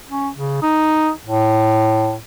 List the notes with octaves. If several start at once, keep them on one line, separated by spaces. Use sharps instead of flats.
C#4
C#3
D#4
A2